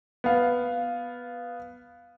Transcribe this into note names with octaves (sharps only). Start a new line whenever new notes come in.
B3 F5